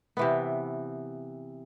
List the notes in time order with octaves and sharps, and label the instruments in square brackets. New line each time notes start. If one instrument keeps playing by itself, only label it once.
[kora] C3 E3 B3